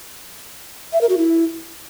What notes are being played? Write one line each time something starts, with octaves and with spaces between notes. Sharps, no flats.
E5
A#4
F#4
E4